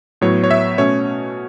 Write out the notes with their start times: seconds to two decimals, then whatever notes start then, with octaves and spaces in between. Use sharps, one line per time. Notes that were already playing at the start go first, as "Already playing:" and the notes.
0.21 A2 F#3 B3 C#5
0.44 C#5
0.51 E5
0.78 B2 A3 C#4 C#5